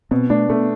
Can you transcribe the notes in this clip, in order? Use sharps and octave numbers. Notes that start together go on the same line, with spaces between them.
B2 C4
A3 D4
A3 B3